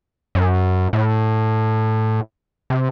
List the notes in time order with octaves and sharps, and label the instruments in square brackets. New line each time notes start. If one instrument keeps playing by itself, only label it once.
[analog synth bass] F#2
A2
C3